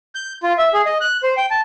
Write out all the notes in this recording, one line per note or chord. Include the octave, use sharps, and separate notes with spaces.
G6
F4
E5
G#4
D#5
F#6
C5
G5
A5